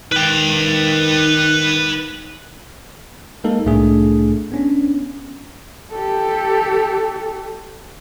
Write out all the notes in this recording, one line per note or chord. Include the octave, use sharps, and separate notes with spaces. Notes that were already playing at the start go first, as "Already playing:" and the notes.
D#3 B4 G5
G#3 A#3 D#4 A4 A#4
C2 A2 A3 D4 G#4
B3 C#4 D4
G4 A4